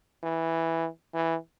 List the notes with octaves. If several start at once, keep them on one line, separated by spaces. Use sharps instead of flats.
E3
E3